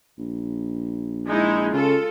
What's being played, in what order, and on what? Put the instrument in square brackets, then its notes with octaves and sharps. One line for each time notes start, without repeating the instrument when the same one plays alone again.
[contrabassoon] A#1
[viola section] G#3 D#4 E4
[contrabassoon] C#3 [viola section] F4 A4